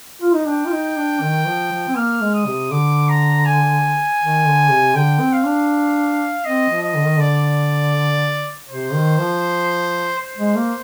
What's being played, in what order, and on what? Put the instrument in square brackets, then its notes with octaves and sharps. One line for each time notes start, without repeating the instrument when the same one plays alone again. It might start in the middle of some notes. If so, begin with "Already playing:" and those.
[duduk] F4
D#4
[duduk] D4 [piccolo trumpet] G5
[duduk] F4
D#4
D4
D#3
F3
F3
C4
[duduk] A#3 [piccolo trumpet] F6
[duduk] G#3
[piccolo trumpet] D#6
[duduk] C3
[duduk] D3 [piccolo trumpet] D6
[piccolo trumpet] A#5
G#5
[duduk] D#3
D3
C3
[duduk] D3 [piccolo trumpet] G5
[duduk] C4
[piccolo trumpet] F5
[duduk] D4
[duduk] C4 [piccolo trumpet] D#5
[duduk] F3
[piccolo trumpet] D#5
[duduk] D3
D#3
[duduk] D3 [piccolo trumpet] D5
[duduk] C3 [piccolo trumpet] C5
[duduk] D#3
F3
[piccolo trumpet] C5
[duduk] G#3
A#3